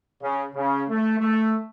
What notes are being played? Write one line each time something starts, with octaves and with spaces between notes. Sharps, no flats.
C#3
C#3
A3
A3